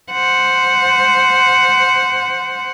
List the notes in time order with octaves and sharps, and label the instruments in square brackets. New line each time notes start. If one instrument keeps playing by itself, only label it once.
[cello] C5 F#5